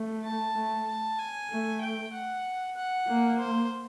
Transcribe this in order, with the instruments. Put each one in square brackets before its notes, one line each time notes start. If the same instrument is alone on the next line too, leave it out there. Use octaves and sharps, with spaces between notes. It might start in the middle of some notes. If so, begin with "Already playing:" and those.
Already playing: [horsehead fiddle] A3
[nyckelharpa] A5
[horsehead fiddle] A3
[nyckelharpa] A5
G#5
[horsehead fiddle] A3
[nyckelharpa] G5
F#5
F#5
[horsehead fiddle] A#3
[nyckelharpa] C5